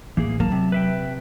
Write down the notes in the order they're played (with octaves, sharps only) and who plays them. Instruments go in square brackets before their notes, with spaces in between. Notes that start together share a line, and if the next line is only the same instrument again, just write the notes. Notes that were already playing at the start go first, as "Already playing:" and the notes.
[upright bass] A1 [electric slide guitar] E3 A#3 G#4
[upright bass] F#3 [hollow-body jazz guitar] A#3 [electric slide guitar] A5
[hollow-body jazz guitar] C3
[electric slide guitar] B4 E5 G5